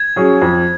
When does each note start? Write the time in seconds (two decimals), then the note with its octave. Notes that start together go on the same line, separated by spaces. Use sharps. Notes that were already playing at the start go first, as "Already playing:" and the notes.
Already playing: G#6
0.16 F#3 C#4 G#4
0.42 F2